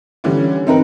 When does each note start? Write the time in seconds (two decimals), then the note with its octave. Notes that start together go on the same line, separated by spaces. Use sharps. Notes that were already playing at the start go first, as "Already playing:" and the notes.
0.24 D3 E3 G3 C#4
0.67 C4 D#4 A#4 B4